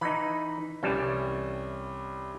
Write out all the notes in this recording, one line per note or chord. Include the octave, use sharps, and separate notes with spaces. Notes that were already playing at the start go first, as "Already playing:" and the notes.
E3 D#4 B5
C2 E3 G3 C#4 A5